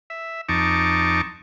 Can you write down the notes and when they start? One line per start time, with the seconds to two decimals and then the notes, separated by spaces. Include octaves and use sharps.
0.10 E5
0.49 F2 D#4 A5 C#6 D6